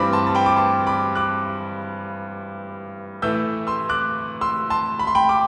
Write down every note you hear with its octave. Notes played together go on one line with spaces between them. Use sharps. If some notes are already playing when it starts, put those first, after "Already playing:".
Already playing: G2 E3 G3 C4 B5 D6
A5 C6
A5
G5 B5
D6
A5 C6
B5 D6
D6 F#6
A2 E3 A3 E6 G6
C6 E6
D6 F#6
C6 E6
A5 C6
B5
C6
G5 B5
B5 D6